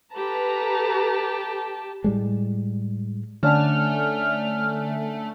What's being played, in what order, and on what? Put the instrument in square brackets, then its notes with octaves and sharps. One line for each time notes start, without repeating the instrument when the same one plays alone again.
[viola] G4 A5 [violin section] A4 B4 A#5
[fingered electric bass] A2 G3 G#3
[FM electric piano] D3 D5 [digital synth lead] A3 [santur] C#4 D4 F#5 [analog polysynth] F6